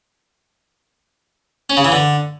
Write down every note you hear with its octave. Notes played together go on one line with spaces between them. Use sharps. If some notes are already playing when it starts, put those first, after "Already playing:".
C#4
C#3
E3
D3